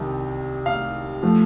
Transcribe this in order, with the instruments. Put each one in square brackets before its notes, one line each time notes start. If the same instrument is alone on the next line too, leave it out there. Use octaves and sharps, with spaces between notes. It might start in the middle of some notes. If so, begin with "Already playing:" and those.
Already playing: [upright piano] C2 C3 D#3
F5
F3 A3